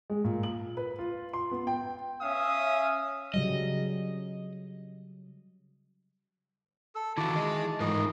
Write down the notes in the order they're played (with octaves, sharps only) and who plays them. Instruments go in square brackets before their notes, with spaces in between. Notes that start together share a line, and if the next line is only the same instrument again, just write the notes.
[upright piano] G#3
A#2
F#7
B4
F4
C6
B3
G5
[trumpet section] C#4 E5 F5 D#6
[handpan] C#3 F#3 G3 [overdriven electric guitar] D#5
[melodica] A4 E6
[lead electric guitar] D#3 E3 [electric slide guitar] E4 F#4 [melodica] A5 D6
[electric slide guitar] G#4 D#5
[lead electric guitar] G#2 E3 [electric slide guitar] D#4 F4 A#4 [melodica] D#5